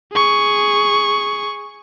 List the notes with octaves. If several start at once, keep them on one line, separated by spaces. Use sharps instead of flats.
G#4 C#6